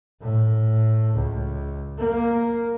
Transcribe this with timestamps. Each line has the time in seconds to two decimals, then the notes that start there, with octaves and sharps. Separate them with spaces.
0.21 A2
1.15 C#2
1.98 A#3